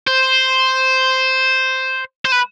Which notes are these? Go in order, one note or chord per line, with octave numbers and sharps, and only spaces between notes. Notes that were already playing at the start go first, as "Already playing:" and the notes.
C5
C5
B4